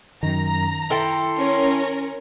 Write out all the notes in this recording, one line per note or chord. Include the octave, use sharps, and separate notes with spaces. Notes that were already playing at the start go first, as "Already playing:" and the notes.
F#2 D#3 A#5
E4 A4 G5 C6
C#4 A#4